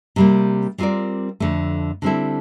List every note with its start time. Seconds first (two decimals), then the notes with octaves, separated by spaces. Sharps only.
0.16 C3 G3 A#3
0.78 G3 C4 F4 A#4 D5
1.40 F2 D3 A3
2.02 D3 G3 C4 E4 A4